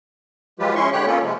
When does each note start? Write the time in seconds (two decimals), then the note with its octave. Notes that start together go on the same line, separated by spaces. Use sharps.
0.59 F3 F#3 G#3 F4 G4 B4
0.75 G#3 C#4 E4 C6 C#6
0.93 D3 G#3 G4 C#5 G5 F#6
1.06 A#3 B3 C#4 F4 A4
1.23 C3 F3 G#3